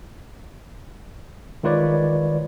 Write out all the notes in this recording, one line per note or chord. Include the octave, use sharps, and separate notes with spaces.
D#3 G#3 F4 B4 C#5 D5